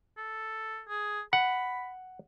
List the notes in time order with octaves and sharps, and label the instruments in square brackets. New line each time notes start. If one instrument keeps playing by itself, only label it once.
[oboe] A4
G#4
[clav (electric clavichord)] F#5 [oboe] B5